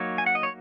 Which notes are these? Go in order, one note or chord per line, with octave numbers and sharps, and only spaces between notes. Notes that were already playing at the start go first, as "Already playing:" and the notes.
Already playing: F#3 A#3 D#4 C#5
G#5
F#5
D#5
C#5